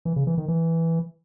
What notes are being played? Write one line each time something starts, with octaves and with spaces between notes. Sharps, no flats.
E3
C#3
E3
D#3
E3